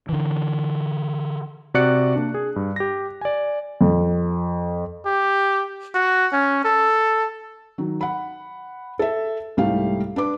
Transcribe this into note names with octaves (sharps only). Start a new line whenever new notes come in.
D3 E3
C3 F#4 D5 F#6 C#7
A#3 D4
G#4
G2
G4 A#6
D5 G#5
F2
G4
F#4
C#4
A4
D#3 F#3
F#5 B5
A4 E5
C2 G#2 G3 A3 F5
D4 B4 D6